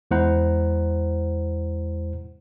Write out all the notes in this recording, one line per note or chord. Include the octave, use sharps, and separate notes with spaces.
E2 G#3 E4 C5 F#5 A#5